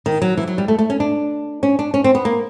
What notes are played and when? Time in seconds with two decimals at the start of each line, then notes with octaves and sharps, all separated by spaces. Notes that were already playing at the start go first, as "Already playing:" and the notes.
0.06 D#3
0.22 F#3
0.37 E3
0.47 F#3
0.58 G3
0.68 A3
0.78 A3
0.90 C#4
1.00 D4
1.63 C#4
1.79 D4
1.94 C#4
2.04 C4
2.15 B3
2.25 A#3